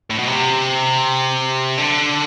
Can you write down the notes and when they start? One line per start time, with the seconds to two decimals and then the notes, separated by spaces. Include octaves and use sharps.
0.10 A2
0.18 B2
0.28 C3
1.78 D3